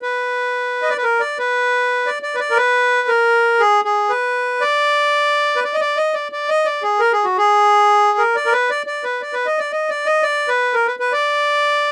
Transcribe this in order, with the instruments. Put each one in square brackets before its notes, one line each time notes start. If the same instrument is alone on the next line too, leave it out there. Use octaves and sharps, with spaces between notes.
[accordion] B4
D#5
D5
B4
A#4
D5
B4
D5
D5
B4
D5
A#4
B4
A#4
G#4
G#4
B4
D5
B4
D5
D#5
D5
D#5
D5
D5
D#5
D5
G#4
A#4
G#4
F#4
G#4
A#4
D5
A#4
B4
D5
D5
B4
D5
B4
D#5
D5
D#5
D5
D#5
D5
B4
A#4
B4
B4
D5